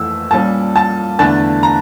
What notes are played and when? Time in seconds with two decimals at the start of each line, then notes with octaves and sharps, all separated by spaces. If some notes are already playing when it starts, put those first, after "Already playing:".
Already playing: F2 E3 A3 E6
0.31 A#2 G3 C#4 A5
0.76 A5
1.19 E2 D3 A3 D4 A5
1.63 A#5